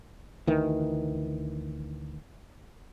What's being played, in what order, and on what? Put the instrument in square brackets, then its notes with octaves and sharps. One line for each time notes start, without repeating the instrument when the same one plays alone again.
[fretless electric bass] D2 D#3 E3